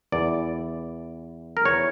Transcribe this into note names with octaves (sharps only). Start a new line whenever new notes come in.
E2 E3 D5
A#4
E2 E3 C#5